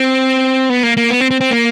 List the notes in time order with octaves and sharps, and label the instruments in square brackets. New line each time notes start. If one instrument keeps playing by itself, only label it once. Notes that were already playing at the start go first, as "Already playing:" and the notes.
Already playing: [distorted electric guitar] C4
B3
A#3
A#3
B3
C4
C4
C4
A#3